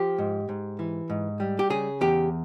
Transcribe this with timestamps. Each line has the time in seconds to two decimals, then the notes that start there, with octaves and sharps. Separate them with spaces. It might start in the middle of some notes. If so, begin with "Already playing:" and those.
Already playing: F3 G4
0.18 G#2
0.49 G#2
0.79 E3
1.10 G#2
1.40 G3
1.59 G4
1.70 C#3 G#4
2.01 E2 G4